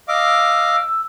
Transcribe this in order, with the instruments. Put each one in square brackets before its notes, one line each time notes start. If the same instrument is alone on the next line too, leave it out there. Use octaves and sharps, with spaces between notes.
[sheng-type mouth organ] D#5 F5 D6 [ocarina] E6